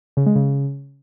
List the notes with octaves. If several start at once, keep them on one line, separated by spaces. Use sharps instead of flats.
C#3
G#3
C#3